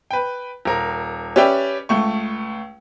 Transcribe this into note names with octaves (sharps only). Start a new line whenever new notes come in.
B4 G5
D#1 A#4
C#4 G4 B4 D5 E5 G5
C#2 A3 C#6